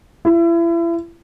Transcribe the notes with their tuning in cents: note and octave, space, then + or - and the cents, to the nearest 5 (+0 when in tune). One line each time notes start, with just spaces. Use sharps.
E4 +35